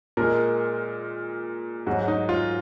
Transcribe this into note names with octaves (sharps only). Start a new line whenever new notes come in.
A#2 G#3 A#4
G#2 F#3 F#4
D#4
F4